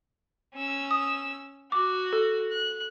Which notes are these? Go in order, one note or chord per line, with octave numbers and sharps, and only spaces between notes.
C#4 E6
D#6
F#4 D6
A4
F#6